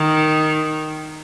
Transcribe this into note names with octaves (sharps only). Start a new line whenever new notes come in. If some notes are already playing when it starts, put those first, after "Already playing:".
Already playing: D#3